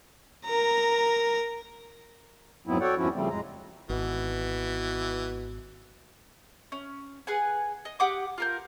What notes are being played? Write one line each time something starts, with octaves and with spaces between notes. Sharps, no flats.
A#4 A#5
F2 G#2 F#3 B3 C4 E4
F#4 A4 C#5 D5 F#5 G5
E2 G2 F3 C#4 E4 F#4
C#3 F3 G3 A3 C4
F2 A2 G#3 A#5
G#1 B2 E3
C#4
G#4 B4 F#5 G#5
D#5
G4 F#5 D6 D#6
F4 A#4 G6